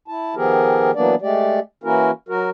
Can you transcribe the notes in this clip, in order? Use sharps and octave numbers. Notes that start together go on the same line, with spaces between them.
E4 A5
D#3 F3 B3 G4 G#4 A#4
E3 F#3 A#3 B3 D4 D5
G#3 A3 G4 D5
E3 A#3 C#4 E4 F#4 A#4
F#3 F#4 A#4